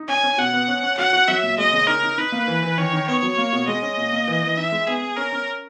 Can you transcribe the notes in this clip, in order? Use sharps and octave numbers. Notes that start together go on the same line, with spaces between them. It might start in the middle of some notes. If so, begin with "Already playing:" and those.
Already playing: D#4
C#4 G#5
C#4
B2 F#5
B3
C#4
C#4
F#4 F#5
F#4
F#3 E5
A#2
G#3 D#5
C#3
D#4 A#4
D#4
D#4 B4
A#3
E3
E3
D#3 C#5
D#3
B3 C#5
F#3
A#3
B2
G#3 D#5
C#4
A#2
A#3
E3
E3
D#4 E5
G#3
B3 G#4
B3
C#4 A#4
C#4